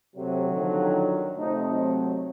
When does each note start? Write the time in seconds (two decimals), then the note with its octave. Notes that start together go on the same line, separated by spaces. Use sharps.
0.15 C3 F#3 A3
0.50 D3 D#3 F3
1.37 C3 A3 C4 D#4
1.69 F#3